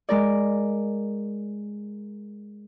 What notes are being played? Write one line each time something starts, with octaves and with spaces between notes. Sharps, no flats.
G#3 A#4 D5